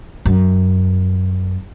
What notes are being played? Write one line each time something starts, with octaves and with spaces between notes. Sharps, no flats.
F#2